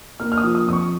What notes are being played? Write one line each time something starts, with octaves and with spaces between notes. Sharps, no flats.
A#3 F6
F6
D#6
F3
D#6
F2 D#6
C#6